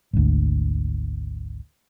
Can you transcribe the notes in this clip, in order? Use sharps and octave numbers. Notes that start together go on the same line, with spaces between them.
G#1 D2